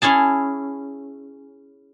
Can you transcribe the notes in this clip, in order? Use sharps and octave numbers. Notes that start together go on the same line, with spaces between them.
C#4 E4 G#4 A5